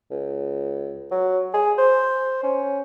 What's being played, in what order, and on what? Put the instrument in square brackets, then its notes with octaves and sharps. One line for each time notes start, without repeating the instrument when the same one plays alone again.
[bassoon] C#2
F#3
G#4
C5
C#4